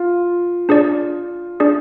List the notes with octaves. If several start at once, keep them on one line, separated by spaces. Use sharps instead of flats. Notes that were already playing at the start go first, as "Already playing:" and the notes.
Already playing: F4
D4 G#4 D5
D4 G#4 D5